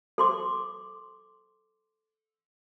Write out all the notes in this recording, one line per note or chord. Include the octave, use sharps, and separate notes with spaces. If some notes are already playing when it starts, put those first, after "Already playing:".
A4 C6 D6